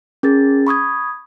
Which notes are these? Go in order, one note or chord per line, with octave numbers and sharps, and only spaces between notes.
C#4 G#4 A#4 A6
B5 C#6 D#6 G#6